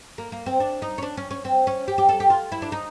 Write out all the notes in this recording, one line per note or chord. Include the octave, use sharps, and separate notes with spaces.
A#3
A#3
C4
D4
D#4
C#4
D4
C#4
C#4
C4
C#4
G4
G4
A4
G4
F4
E4
D4
D#4